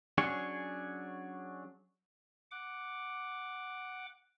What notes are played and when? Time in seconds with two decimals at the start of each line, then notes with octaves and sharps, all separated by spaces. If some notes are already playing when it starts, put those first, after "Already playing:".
0.18 F#3 C#4 D4 G#4 C#5
2.51 F#5 D6